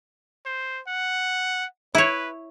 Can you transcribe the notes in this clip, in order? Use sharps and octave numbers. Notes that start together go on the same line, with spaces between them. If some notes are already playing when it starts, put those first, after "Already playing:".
C5
F#5
E4 B4 C#5